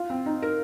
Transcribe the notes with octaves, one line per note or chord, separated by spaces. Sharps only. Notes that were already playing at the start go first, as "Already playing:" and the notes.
Already playing: F4
C4
D#4
A#4